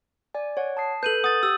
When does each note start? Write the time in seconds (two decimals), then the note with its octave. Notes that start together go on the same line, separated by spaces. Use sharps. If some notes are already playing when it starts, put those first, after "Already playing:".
0.34 D5 G#5
0.57 C#5 F#5
0.77 A5 D#6 C7
1.03 A4 B4 G6 D#7 F#7
1.24 F#5 D#6 A6
1.43 G4 E6